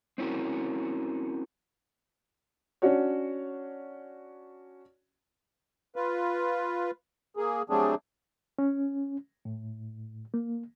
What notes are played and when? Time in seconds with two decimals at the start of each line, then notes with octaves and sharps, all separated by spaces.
0.18 C4 C#4 E4 F#4 A#4
2.82 C#4 D4 F#4 C#5
5.96 F4 B4
7.37 A#3 G#4
7.70 F#3 G3 A3 C4 D4 G#4
8.59 C#4
9.45 A2
10.34 A#3